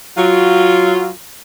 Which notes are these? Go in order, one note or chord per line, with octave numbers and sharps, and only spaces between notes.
F#3 F4